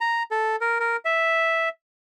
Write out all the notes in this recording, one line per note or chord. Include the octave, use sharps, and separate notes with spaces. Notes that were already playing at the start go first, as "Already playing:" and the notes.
A#5
A4
A#4
A#4
E5